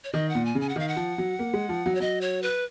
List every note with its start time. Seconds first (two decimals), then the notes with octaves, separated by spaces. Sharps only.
0.04 C#5
0.13 D#3 D#5
0.29 F#5
0.35 A#2
0.45 G#5
0.55 C#3
0.61 G#5
0.69 F#5
0.76 D#3 F5
0.88 F#5
0.96 F3
1.18 F#3
1.39 A#3
1.53 G#3
1.69 F3
1.86 F#3
1.95 C#5
2.00 F#3 D#5
2.21 C#5
2.43 B4